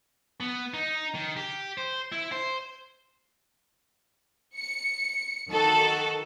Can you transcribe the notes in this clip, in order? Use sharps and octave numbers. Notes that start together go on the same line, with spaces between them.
B3
D#4
D#3
G4
C5
E4
C5
C#7
D#3 F#4 A4